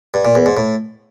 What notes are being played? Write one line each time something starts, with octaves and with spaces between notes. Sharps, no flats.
G2
A#2
E2
G#2
A2